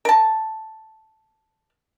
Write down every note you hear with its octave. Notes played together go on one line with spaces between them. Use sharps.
A#4 A5